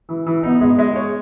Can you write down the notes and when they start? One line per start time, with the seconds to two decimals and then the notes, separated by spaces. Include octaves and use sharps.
0.09 E3
0.26 E3
0.43 B3 D#4
0.61 G#3
0.79 G#3
0.96 C#5